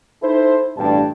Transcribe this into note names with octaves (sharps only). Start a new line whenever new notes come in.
D#4 E4 A4 C5
A1 G2 B2 D4 G5 A5